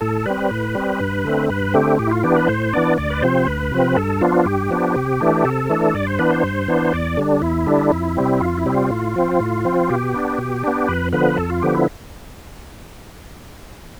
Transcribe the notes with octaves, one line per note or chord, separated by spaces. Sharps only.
A2 A4
G3 C4 B4
A2
G3 C4
G2
D3 A3 C4
G2 B4
D3 A3 C4 G4
A2 G4
E4
F4
E3 B3 D4 G4
B4
A2 C5
E3 B3 D4 D5
D2 D5
B4
C3 F3 C4 C5
D2 B4
C3 F3 C4
G2 A4
F3 B3 D4 F4
G2 G4
F3 B3 D4
C3
E3 A3 D4
C3 A4
E3 A3 D4
G2 D5
C5
E3 B3 D4 B4
C5
G2
E3 B3 D4
E2 D5
D3 G3 D4
E2 E4
D3 G3 D4
F2
C3 G3 C4
F2 F4
E4
C3 G3 C4
F4
A2
F3 C4
A2
F3 C4
B2 G4
B3 D4
B2
B3 D4
F2 B4
D3 F3 B3 B4
F2 A4
F4
D3 F3 B3 G4
E4